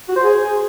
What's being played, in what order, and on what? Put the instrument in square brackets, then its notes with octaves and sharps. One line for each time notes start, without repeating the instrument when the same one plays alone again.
[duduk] F#4
C5
G#4